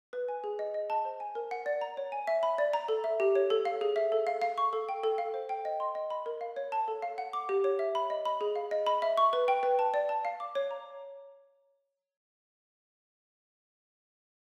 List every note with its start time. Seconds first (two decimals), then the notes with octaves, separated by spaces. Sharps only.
0.13 B4
0.28 G#5
0.44 G#4
0.59 D#5
0.74 D#5
0.90 A5
1.05 C5
1.20 G#5
1.35 A#4
1.51 F#5
1.66 D5
1.81 A#5
1.97 C#5
2.12 G#5
2.27 E5
2.43 B5
2.58 D5
2.73 A#5
2.88 A4
3.04 E5
3.20 G4
3.35 C#5
3.50 A4
3.65 F5
3.81 G#4
3.96 E5
4.12 A4
4.27 F5
4.42 F5
4.58 C#6
4.73 A4
4.89 G5
5.04 A4
5.18 F5
5.34 C5
5.49 G5
5.65 D#5
5.80 C6
5.95 D#5
6.10 B5
6.26 A#4
6.41 F5
6.56 C#5
6.72 A5
6.88 A4
7.02 F5
7.18 F#5
7.33 D6
7.49 G4
7.64 C#5
7.79 E5
7.95 B5
8.10 D#5
8.25 B5
8.41 G#4
8.56 F5
8.71 D#5
8.87 B5
9.02 E5
9.17 C#6
9.33 B4
9.48 G5
9.63 B4
9.79 A5
9.94 D5
10.09 A5
10.25 F5
10.40 D6
10.55 C#5
10.71 A#5